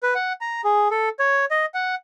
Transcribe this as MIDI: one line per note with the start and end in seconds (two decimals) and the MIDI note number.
0.03 0.14 71
0.15 0.33 78
0.41 0.61 82
0.64 0.88 68
0.91 1.09 69
1.19 1.45 73
1.51 1.66 75
1.74 1.95 78